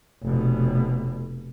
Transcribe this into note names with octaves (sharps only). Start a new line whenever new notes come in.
F1 B2